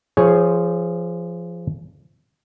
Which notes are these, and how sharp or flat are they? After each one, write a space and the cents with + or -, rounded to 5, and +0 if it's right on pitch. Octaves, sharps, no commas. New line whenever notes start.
F3 -20 G#4 +0 C#5 +0